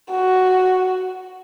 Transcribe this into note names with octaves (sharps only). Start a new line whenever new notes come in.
F#4